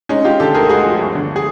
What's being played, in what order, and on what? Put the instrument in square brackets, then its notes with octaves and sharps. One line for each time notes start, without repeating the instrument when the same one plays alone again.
[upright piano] G#3 C#4 D#4
G#3 F4 G4
D3 G4 A4
D2 G#4 A#4
G#3 F#4 G#4
F3
G1
D3
G#4